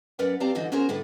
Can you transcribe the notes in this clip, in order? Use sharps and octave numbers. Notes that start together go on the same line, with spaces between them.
F#2 A#4 B4 D5 F#5
C4 G4 D5 F5 A5 A#5
G#2 D3 E3 F#4 D#5
C#4 F#4 G#4 A#4 C5
A2 D3 A4 B4